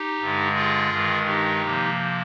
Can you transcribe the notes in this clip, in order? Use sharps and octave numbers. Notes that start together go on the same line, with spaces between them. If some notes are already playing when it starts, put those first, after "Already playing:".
Already playing: D#4 G4
G2 D3 G#3
F4 G#4
G2 D#3 G#3
D#4 G4
C3 F3 A#3